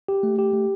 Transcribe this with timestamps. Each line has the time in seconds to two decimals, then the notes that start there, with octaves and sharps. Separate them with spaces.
0.08 G4
0.23 A3
0.39 G4
0.53 A3